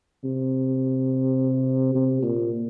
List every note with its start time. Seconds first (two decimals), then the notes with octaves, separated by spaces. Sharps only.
0.24 C3
1.95 C3
2.22 A#2